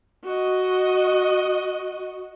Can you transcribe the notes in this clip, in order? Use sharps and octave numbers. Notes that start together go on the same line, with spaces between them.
F#4 D#5